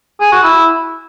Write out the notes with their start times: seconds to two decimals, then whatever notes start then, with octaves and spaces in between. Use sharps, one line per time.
0.20 G#4
0.32 F#4
0.43 E4